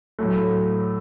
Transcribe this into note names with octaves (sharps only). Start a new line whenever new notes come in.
A2 F#3 A3